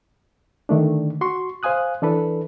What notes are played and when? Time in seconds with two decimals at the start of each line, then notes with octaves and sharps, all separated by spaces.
0.69 D3 D#3 A3 D4
1.21 F#4 C6 C#6
1.63 C5 F5 G#5 D#6 F#6
2.02 E3 D4 A4 B4